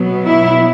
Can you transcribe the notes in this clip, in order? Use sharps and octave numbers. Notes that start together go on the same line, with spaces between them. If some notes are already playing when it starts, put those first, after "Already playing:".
Already playing: B2 F#3 B3
E4